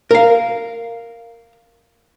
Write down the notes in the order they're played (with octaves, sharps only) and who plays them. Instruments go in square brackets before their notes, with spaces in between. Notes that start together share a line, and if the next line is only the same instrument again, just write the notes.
[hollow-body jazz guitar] A#4 F5